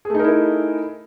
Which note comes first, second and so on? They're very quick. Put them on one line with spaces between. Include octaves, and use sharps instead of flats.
G#4 A3 D#4 A#4 E4